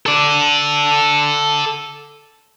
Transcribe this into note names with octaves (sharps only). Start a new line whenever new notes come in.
A4 D5